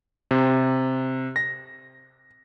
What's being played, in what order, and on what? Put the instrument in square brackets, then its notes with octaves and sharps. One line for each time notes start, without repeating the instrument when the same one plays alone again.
[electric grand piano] C3
A#6